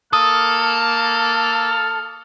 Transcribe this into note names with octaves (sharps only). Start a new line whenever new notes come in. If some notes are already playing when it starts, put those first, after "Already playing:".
A#3 A4 D#6 F6